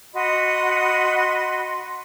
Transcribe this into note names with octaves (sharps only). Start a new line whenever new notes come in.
F#4 D#5 B5 C6